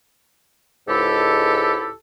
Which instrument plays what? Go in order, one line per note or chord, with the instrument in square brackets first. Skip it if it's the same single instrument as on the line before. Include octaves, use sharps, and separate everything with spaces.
[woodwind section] C#2 G#2 E4 G4 A4